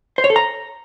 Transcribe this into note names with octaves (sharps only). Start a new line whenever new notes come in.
C5
C#5
A4
A#5